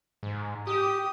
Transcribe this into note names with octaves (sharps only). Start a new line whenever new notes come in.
G#2
G4 D#6